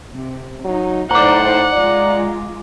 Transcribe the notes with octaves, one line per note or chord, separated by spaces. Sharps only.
C3
F#3 D#4
A2 D#4 C5 D5 F#5 A#5 D6
G#3 F4 D5